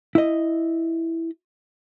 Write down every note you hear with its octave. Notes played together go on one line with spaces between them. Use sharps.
E4 D#5